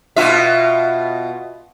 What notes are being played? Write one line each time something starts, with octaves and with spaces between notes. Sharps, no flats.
B2 F4 E5